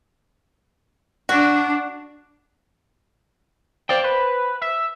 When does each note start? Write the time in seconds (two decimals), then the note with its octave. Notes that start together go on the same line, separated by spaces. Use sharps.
1.29 D4 F#4
3.89 C5 D5 F5 G5
4.04 B4
4.61 E5